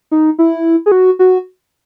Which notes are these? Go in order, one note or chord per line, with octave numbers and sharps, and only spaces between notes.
D#4
E4
G#4
F#4
F#4